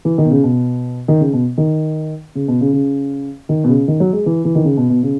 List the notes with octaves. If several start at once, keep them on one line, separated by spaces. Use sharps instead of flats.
E3
D#3
B2
C#3
B2
D#3
C#3
B2
D#3
C#3
B2
C#3
C#3
D#3
B2
C#3
D#3
F#3
G#3
E3
E3
D#3
C#3
B2
B2
C#3